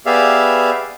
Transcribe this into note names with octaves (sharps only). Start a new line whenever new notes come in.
B3 G4 G#4 D5 E5 F5